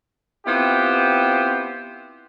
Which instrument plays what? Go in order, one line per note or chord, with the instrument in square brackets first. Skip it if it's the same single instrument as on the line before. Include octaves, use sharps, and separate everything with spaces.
[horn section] B3 C4 E4 F4 G4 C5